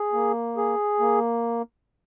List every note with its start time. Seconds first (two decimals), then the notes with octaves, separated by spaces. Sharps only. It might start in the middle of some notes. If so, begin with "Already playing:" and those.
Already playing: G#4
0.13 A#3
0.57 G#4
1.00 A#3